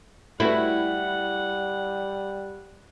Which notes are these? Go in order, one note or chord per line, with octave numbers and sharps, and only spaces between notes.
G3 A3 E4 F#4 B4 F#5